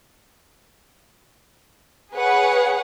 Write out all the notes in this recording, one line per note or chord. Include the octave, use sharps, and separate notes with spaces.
G#4 B4 C#5 F#5